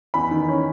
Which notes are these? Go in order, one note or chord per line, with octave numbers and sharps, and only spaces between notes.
E2 B5
D#3
C#4